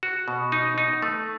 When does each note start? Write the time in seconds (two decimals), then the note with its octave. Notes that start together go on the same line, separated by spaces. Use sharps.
0.03 F#4
0.28 B2
0.52 D#4
0.78 D#4
1.02 A3